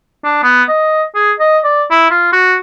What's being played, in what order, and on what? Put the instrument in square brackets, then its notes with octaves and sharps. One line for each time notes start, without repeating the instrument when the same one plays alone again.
[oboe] D4
B3
D#5
G#4
D#5
D5
E4
F4
F#4